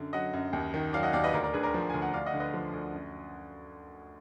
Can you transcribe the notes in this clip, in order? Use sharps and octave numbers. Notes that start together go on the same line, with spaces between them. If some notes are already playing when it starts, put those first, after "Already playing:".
Already playing: F#2 D3
F#3 D#5 F#5
F#2
D#2
D#3
F#3 D5 F5
D#5 F#5
D#2 D5 F5
B4 D#5
D2 A#4 D5
A#4 D5
D3 G#4 B4
A#4 D5
F3
D2 G#5
F#5
D2 D5 F5
D#5 F#5
D3
B4 D#5
F3
D2
F#2